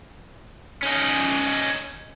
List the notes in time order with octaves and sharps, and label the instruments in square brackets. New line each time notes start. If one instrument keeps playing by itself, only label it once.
[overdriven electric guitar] C#4 D#4